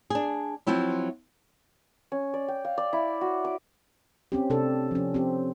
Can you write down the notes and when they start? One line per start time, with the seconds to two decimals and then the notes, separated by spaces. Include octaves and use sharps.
0.10 D4 G#4
0.67 F3 F#3 C4 E4 F4
2.12 C#4
2.34 D5
2.48 G5
2.65 F5
2.78 D5
2.93 E4
3.21 F#4
3.45 D6
4.32 C4 C#4 G4
4.50 C3 D4 A4
4.91 F3 C#4
5.14 C4 G4